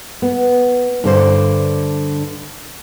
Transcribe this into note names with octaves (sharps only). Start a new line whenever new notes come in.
B3
G2 D3 C5